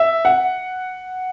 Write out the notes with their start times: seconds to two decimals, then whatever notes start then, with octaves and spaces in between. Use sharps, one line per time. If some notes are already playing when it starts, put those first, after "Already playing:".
Already playing: E5
0.25 F#5